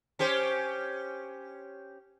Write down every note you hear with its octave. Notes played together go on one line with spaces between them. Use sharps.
C#4 G4 C5